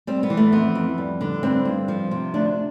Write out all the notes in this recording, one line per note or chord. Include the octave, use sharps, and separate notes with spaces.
G3 C4
B3
E3
A3
F2 B3
F2
G3
D3
G2 C4
G2
F3
C3
D2 D4